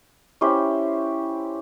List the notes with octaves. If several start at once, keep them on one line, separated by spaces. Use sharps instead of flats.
C#4 E4 G4 C5